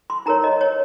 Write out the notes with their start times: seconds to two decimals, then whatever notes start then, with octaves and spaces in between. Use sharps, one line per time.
0.10 C6
0.26 D#4 A#4 C#5 A#5
0.44 D#5
0.61 C#5